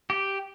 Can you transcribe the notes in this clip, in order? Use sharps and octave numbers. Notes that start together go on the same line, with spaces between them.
G4